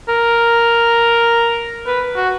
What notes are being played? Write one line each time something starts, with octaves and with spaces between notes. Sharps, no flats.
A#4
B4
F#4